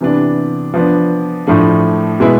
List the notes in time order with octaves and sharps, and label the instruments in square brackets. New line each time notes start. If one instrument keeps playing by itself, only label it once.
[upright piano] C3 E3 B3 D4
F3 B3 D4
A2 F3 A3 D4
B2 G#3 B3 E4